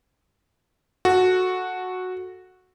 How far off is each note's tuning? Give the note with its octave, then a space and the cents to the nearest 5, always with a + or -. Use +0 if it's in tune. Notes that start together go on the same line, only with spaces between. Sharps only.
F#4 -10 A4 +0